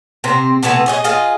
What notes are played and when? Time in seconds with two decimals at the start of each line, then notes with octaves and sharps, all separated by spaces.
0.24 C3 C4
0.63 C3 E3 A3 B3
0.86 G#4 C#5 D#5
1.04 F4 G#4 D#5